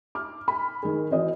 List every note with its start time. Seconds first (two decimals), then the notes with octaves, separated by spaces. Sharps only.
0.15 D6 F6
0.48 B5
0.83 D#3 G#4
1.11 E3 C4 F#4 D#5